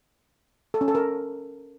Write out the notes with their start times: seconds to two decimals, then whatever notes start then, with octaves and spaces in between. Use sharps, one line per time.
0.74 A4
0.81 C#4
0.88 A4
0.95 A#4